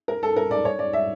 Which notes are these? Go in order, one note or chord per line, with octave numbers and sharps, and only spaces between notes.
A#4
A4
A#4
D5
C#5
D5
E5